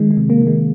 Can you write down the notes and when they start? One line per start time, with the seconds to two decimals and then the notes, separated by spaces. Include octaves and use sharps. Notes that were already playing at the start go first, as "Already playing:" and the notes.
Already playing: D#3 G#3
0.11 G#3
0.17 C3
0.30 A#3
0.42 D#3
0.47 G#3